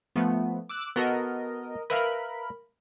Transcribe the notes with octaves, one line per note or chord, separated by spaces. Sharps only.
F3 A3 B3
D6 E6 F#6
B3 F#4 A4 A#4 D#5
A#4 B4 E5 F5 B5